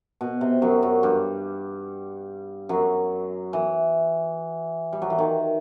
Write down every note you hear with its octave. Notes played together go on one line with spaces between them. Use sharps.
B2
C3
F#2 F#3
F#2 F#3
G2 G3
F#2 F#3
E3
G3
F#3
E3
D#3